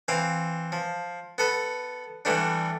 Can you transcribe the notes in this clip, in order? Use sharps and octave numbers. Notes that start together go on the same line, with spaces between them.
E3 C4 F5
F3
B3 A4 B4
E3 G3 A3 B3 D4